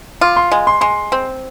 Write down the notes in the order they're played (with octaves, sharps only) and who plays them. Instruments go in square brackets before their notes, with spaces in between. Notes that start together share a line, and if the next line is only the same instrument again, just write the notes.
[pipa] F4 [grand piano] D6
[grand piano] C6
[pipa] G#3
[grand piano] C6
[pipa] G#3 [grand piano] C6
[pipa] C4